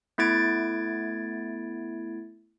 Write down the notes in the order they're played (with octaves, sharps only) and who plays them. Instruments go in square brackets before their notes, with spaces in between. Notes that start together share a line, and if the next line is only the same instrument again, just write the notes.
[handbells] A3 B3 E4 G#6 A6 D7